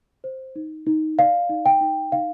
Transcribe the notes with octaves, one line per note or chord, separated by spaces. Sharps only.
C5
D#4
D#4
D5 F5
D#4
G5
D#4
D#4 F5